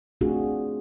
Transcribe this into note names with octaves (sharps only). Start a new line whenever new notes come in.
A3 C4 D4 F4 F#4 G#4